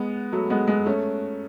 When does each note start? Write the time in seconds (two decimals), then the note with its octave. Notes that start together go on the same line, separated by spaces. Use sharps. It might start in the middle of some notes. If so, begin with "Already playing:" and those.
Already playing: G#3 B3
0.32 F#3 A3
0.50 G#3 B3
0.68 G#3 B3
0.86 A3 C#4